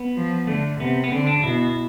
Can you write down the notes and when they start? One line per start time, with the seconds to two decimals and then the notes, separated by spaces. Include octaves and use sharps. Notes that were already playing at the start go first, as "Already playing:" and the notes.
Already playing: B3
0.16 F3
0.47 D3 A3
0.80 C3 B3
1.04 B3
1.11 D3 C4
1.27 D4
1.43 B2 E4